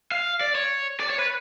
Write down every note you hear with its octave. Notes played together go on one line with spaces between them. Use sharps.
F5
D5
C#5
D5
C#5
B4